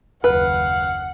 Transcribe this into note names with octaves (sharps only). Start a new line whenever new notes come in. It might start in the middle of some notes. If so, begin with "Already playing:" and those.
F#1 D#2 B4 F5 F#5